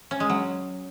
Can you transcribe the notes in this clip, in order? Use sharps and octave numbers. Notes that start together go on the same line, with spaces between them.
C#4
G#3
F#3